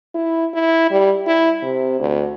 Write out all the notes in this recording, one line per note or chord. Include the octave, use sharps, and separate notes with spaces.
E4
E4
G3
E4
C3
D2